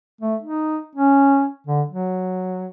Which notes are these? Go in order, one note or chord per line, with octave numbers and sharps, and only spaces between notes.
A3
D#4
C#4
D3
F#3